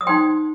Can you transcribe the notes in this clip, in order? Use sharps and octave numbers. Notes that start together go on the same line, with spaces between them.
D#6
D#4 C5 G5 C6